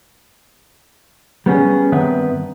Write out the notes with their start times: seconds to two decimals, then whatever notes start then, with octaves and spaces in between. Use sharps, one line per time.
1.46 G3 B3 C#4 G#4
1.92 G2 D#3 B3 C4 B4 E5